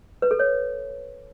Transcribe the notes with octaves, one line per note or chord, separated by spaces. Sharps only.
B4
A4
C#5